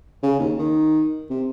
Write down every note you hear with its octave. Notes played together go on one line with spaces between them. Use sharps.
C#3
D#2
D#3
C3